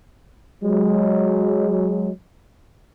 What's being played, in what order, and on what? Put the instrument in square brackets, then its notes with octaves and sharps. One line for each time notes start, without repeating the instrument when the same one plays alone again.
[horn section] F#3 G#3